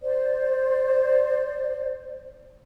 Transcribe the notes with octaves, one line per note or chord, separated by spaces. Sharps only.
C5 D5